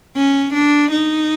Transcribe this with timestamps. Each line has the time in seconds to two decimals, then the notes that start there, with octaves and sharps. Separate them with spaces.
0.16 C#4
0.54 D4
0.91 D#4